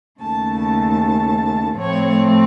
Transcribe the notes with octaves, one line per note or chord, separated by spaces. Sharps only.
D#2 C#3 A3 A5
A5
A2 F3 A3 C4 C#5